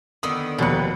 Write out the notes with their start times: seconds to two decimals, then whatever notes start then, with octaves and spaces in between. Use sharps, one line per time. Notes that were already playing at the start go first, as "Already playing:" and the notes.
0.23 D3 D#3 B3 D#6
0.58 F1 D#2 B2 B4 C#7